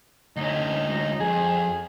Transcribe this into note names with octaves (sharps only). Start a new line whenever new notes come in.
D2 C#4 D#4
F2 G#4